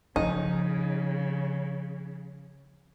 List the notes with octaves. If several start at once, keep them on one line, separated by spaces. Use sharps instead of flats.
C#3 F3 D#4